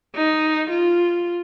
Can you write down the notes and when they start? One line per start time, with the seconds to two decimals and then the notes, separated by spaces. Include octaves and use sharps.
0.15 D#4
0.70 F4